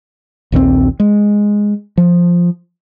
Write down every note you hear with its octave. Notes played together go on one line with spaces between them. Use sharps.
A#1 D#2 E3 C4
G#3
F3